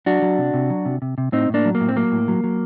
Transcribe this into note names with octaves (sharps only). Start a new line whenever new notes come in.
F#3 D4 F#4
F#3
C3
C3
F#3
C3
C3
C3
A2 C4 D#4
A2 A#3 D4
F#3
A#3
A2
C4
F#3 A#3
A2
F#3
F#3